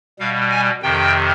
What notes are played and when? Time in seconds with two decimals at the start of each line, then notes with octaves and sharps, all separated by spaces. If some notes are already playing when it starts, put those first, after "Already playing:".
0.19 B2 G3 F5
0.51 G#5
0.83 F2 C3 D#3 G5